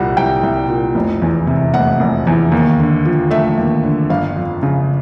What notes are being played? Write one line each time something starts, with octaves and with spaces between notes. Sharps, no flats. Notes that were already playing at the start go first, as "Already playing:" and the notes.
Already playing: C2 A#2 G3 F#5
C2 G5
C2
A#2
F1
E2
C3
F1 F#5
F1
E2
D#2
D3
F3
A3 E5
D#2
D3
G1 F5
F2
C#3